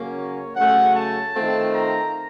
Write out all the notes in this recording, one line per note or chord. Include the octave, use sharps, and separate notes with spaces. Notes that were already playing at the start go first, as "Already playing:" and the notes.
Already playing: C#3 F#3 A#3 C#4
C#5
C#3 F#3 A3 C#4 F#5
A5
D#3 A3 C4 F4
A#5